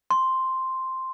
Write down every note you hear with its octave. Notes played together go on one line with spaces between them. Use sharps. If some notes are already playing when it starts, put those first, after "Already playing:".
C6